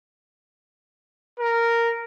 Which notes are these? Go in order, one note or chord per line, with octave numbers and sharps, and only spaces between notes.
A#4